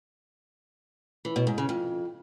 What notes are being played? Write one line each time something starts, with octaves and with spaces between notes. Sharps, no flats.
E3
B2
G#2
C#3
F2